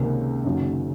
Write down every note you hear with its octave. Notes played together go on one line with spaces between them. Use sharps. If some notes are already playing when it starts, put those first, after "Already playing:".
Already playing: C#2 C3 D#3 A#3 C#4
F#1 F#2 D#3 F#3